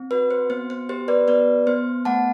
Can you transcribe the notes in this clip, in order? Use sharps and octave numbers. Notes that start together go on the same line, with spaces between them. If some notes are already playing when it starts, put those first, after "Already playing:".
Already playing: C4
F#4 B4
C5
B3 C5
C5
G4 C5
B4 D5
B3 B4 D5
B3 C5
A3 F#5 A5